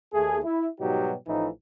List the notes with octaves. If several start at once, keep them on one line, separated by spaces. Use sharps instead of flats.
D#2 A3 G#4
E4
G#2 B2 F#3 G3 D#4 G4
A1 A2 E3 F3 D#4